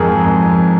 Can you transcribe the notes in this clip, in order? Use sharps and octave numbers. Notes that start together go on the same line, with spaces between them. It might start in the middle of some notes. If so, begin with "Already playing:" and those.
Already playing: F2 G#2 D#4 G#4 A#4
F2